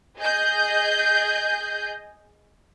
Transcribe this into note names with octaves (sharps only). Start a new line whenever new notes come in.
G#4 D#5 G6